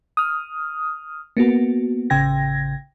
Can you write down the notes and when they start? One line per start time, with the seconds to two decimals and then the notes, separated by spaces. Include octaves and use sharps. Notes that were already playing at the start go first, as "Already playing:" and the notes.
0.17 D#6 F6
1.37 A#3 B3 F#4
2.10 A1 C#3 G5 G#6 A#6